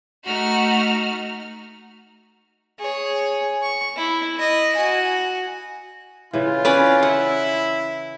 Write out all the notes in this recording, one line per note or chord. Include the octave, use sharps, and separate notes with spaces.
A3 D#4 F#4 F6
G#4 C#5
C#6
E4
E4 D#5
F#4 G#5
C#3 E3 F4
C#4 B4 D5
E4 F#5